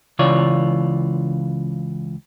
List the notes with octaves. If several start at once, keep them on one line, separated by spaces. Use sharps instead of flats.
C#2 C#3 E3 F4 C#5 D5